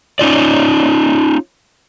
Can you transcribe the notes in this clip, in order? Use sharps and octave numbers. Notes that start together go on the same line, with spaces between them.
C#4 D#4 F4 D5